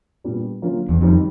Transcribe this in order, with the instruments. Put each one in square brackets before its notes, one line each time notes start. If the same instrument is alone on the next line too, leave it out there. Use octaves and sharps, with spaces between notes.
[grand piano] A#2 G3 B3 D4
D3 F#3 A#3 C#4 F4
[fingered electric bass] E2
[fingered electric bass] F2 [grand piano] D#3 G3 C4 D#4